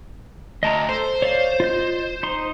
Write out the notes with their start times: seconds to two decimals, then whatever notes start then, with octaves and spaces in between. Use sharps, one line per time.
0.63 D2 D#5 A5 A#5
0.89 A4 C5
1.22 C#5 D5 F5
1.60 F4 D#5 G6
2.23 D#4 C6